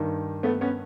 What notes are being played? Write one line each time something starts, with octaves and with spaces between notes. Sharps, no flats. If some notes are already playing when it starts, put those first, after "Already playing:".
Already playing: G2 D#3
A3 B3
B3 C#4